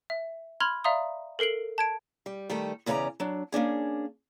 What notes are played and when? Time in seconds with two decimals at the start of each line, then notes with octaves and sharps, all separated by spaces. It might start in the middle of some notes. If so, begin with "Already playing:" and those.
0.10 E5
0.60 B5 C6 F6 G#6 F7
0.84 D5 E5 F5 A#5 C6 D#6
1.39 A4 A#4 C7 D7 F#7
1.78 A5 G#6 D7
2.26 G3
2.50 D#3 G3 A3 A4
2.86 E2 C#3 C#4 A4 D5 A#5
3.20 F#3 D4
3.52 A#3 C#4 D4 G#4